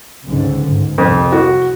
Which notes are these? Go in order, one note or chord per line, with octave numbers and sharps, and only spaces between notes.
C#2 G#2 D3
G#2
C2 F2
F#4